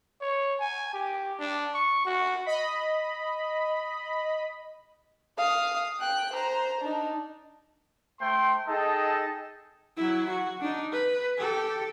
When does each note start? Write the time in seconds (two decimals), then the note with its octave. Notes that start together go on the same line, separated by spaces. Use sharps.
0.21 C#5
0.60 G#5
0.93 G4
1.39 D4
1.74 C#6
2.05 F#4
2.46 D#5 B5
5.38 F5 D#6
6.00 G5 F#6
6.34 C5 A#5
6.82 D4 D#4
8.20 A3 C5 G5 C6
8.68 D#4 G#4 A4 D#5 G5 A5
9.97 F#3 E4
10.29 F#4
10.61 D4 D#4
10.93 B4
11.37 G4 A4